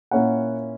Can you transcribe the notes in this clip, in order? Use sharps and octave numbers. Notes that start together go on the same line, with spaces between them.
A#2 A#3 C#4 E4 F#5